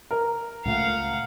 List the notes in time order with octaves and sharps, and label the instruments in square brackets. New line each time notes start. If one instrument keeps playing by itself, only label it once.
[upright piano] A#4
[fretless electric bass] C#2 A#2 A3 [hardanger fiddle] F5 F#5